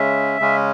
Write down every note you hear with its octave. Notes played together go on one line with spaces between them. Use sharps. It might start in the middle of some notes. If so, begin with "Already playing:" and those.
Already playing: C#3 G#3 C#4 E5
C#3 G#3 C#4